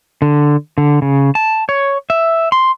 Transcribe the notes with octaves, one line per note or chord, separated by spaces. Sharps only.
D3
D3
C#3
A5
C#5
E5
C6